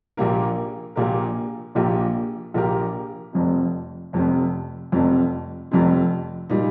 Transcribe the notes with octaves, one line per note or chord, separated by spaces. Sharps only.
A#1 A#2 A#3 G4 A#4
A#1 A#2 A#3 G4 A#4
A#1 A#2 A#3 G4 A#4
A#1 A#2 A#3 G4 A#4
F1 F2 C3
F1 F2 C3
F1 F2 C3
F1 F2 C3
A#2 G3 D#4